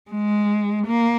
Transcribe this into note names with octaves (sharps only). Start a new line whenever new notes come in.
G#3
A#3